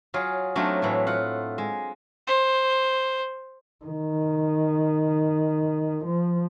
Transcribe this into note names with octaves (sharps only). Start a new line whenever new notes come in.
F#3 F4 G#4
F#3 A3 C4 D4 D#4 F4
A2 E3 F#3
F4 F#5
G#3
C5
D#3
F3